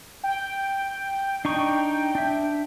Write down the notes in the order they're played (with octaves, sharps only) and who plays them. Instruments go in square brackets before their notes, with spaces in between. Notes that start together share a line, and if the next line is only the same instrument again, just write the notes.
[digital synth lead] G5
[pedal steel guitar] D4 D#4 C#6
D4 E5